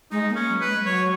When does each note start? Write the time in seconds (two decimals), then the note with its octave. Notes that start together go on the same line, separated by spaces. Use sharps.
0.12 G#3 D#4
0.29 A#3
0.35 C#4
0.49 F#3
0.61 B4
0.67 G#3
0.85 F#3 C#5